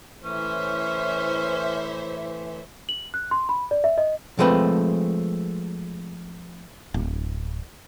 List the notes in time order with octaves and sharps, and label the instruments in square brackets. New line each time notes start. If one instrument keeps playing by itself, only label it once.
[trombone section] A2 E3 [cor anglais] C#4 [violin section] C5 C#5 E5
[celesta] F#7
F#6
C6
B5
D5
E5
D#5
[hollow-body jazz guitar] F3 G#3 A3 C4 B4
[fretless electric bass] D1